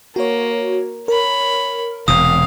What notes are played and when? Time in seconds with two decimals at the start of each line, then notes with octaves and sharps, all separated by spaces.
0.16 A#3 F#4 C#5
1.08 A#4 C#5 B5
2.08 E1 C3 F5 D#6